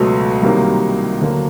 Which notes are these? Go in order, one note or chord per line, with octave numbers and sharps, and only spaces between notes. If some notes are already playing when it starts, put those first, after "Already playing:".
Already playing: C#2 B2 F#3 A3
C2 C3 D#3 F#3 A#3
D2 D3 F#3 A#3